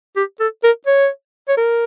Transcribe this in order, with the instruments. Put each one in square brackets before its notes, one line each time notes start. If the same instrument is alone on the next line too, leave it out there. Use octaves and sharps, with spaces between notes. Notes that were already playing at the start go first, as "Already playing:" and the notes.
[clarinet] G4
A4
A#4
C#5
C#5
A#4